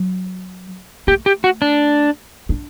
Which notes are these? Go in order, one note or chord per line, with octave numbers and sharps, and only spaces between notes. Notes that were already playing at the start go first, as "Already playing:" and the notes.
Already playing: F#3
A3 G4
G4
F#4
D4
D4